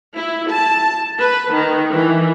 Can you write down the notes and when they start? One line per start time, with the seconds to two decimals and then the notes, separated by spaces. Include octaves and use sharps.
0.16 E4
0.50 A5
1.18 B4
1.53 D#3
1.92 E3